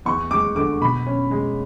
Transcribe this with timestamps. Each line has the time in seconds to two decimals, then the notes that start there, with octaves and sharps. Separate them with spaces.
0.05 E2 C#6
0.31 G#3 D6
0.55 D3 D6
0.81 B2 B5
1.06 C#4
1.31 G#3